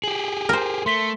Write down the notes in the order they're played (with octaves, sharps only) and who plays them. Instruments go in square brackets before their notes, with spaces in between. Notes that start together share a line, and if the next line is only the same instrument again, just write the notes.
[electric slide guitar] G4 G#4 [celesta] F#7
[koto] A#4 C5
[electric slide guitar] A3 [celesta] C6 B6 G7